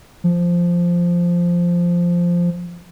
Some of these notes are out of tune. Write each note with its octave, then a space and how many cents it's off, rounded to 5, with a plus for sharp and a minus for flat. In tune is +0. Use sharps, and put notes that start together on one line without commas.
F3 -5